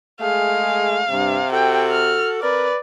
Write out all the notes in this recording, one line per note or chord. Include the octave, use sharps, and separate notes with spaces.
G#3 A3 G#4 F5
G2 C3
F#4 A4 G5
F6
C4 A#4 B4 D5